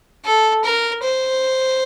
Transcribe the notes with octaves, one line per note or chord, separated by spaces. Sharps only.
A4
A#4
C5